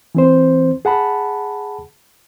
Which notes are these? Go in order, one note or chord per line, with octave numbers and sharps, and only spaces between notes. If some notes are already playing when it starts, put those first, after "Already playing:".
E3 C4 C5
G#4 F#5 A5 B5